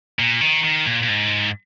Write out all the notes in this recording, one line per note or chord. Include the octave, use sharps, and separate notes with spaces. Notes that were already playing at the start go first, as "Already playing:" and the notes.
A#2
D#3
D#3
A#2
A#2
G#2